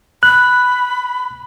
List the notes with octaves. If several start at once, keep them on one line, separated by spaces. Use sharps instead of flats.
B5 F#6